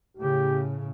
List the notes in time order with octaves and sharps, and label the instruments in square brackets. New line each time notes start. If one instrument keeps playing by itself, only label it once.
[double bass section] A2 C#3 [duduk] G4